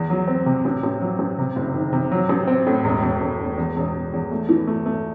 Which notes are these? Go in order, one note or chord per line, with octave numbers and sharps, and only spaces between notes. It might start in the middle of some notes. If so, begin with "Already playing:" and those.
Already playing: E2
F#3
C4
C3
A1
A1
F#3
A1
C3
F#1
D#3
C3
F#3
A1
C4
A2
E1
E1
E1
E1
E2
E1
E1
E2
A3
E3
A3
A3